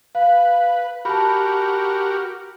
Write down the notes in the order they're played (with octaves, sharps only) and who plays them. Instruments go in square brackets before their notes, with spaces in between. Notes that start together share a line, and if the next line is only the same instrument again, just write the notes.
[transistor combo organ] B4 [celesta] F5
[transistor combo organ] F#4 G4 A#4 [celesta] A5 B5